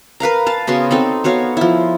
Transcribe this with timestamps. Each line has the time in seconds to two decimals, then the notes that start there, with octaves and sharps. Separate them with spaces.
0.20 A#4 B4 F5 A#5
0.46 F5 A5
0.67 C#3 B3 F#4 C6
0.91 C4 D#4 A4
1.24 B3 F#4 C#5 F5
1.57 F3 E4